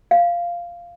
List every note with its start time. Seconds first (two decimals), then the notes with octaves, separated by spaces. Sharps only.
0.11 F5